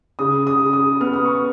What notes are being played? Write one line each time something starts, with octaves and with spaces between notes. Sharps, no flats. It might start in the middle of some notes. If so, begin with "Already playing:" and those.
C#3 D#6
D#6
C#3
D#6
B3 F6
D#6
C#6